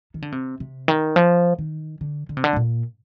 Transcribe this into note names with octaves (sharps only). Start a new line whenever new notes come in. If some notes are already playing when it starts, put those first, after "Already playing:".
D#3
D3
C3
C3
D#3
F3
D#3
D3
D3
C3
D3
G#2
A#2